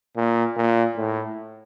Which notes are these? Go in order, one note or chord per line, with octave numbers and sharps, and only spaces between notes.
A#2
A#2
A2